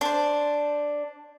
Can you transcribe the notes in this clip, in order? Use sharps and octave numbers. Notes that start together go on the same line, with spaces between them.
D4 C5